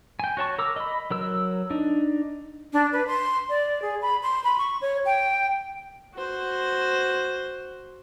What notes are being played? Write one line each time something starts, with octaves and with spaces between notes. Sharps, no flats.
G5 G#5
F#4 C#5 A5 C#6
A#4 A#5 D6 E6
D#5 B5
F#3 A#4 E6
D4 D#4
D4
B4
C6
D5
G#4
B5
C6
B5
C#6
C#5
G5
F#4 C5